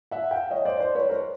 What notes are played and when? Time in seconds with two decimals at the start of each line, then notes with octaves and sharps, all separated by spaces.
0.11 E5 F#5
0.31 F5 G5
0.51 C#5 D#5
0.65 C5 D5
0.80 C5 D5
0.95 B4 C#5
1.09 A#4 C5